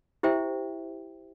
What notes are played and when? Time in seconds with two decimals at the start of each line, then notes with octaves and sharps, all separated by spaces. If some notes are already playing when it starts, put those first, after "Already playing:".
0.23 E4 G4 C5 E5 G5